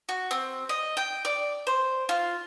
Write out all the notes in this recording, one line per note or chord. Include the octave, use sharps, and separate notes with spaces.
F#4
C4
D#5
G5
D5
C5
F4